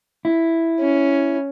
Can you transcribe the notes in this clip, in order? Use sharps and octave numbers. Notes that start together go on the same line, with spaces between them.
E4
C#4